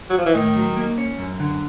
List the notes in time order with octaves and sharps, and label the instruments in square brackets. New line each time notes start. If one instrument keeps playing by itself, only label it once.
[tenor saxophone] F#3
F3
E3
[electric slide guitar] A2 [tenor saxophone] D#3
[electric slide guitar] F#3
A#3
C#4
F#2
D3